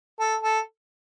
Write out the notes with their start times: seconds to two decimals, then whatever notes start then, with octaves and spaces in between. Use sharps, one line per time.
0.20 A4
0.43 A4